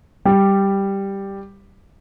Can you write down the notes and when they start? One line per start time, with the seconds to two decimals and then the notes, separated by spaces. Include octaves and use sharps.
0.25 G3 G4